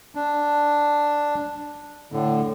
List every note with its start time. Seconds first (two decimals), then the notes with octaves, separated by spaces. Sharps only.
0.15 D4
2.12 A2 D3